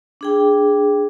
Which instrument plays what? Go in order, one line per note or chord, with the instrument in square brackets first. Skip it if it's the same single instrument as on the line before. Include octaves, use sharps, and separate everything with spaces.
[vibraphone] D4 G#4 G5